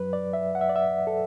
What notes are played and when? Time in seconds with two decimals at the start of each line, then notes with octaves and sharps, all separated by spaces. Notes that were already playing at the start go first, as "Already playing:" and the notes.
Already playing: F#2 F#3 B4
0.13 D5
0.33 E5
0.55 F#5
0.61 E5
0.69 D5
0.76 E5
1.07 A4